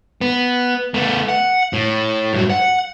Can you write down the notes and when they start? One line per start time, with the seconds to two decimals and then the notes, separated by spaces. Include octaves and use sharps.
0.21 B3
0.94 A3 B3
1.29 F#5
1.73 A2
2.33 G2 F#3
2.50 F#5